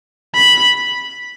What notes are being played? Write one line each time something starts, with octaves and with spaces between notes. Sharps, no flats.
B5